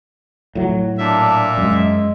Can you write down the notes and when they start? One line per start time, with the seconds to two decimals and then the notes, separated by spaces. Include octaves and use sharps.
0.55 A2 F#3
0.98 A#2 D4 E5
1.58 F#2 G#3